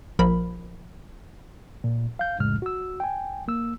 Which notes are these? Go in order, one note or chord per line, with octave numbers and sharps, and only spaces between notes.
A#1 F3 A#4 B5
A#2
F5 G6
C2 F2 A2 C#3 G#3 F6
F#4 E6
G5 G#5
A#3 E6